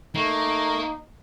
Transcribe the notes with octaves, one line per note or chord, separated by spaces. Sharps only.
A3 A#3 D#4